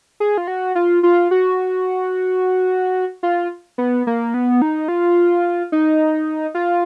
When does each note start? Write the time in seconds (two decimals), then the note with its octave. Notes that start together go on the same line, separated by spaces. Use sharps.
0.20 G#4
0.37 F4
0.48 F#4
0.75 F4
1.03 F4
1.31 F#4
3.23 F4
3.78 B3
4.07 A#3
4.34 B3
4.62 D#4
4.88 F4
5.72 D#4
6.55 F4